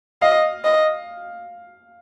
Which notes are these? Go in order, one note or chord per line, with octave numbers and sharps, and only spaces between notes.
D#5 F5
D#5